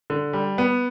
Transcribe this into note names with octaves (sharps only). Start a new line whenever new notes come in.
D3
G3
B3